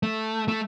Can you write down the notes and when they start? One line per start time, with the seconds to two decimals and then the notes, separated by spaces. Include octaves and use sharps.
0.03 A3
0.48 A3